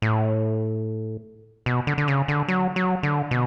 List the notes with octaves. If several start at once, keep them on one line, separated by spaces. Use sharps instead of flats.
A2
B2
D3
D3
C#3
D3
F#3
F#3
D3
B2